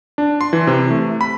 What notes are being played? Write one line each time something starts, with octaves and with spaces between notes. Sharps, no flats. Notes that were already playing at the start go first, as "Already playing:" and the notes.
D4
C6
E3
C3
A3
B5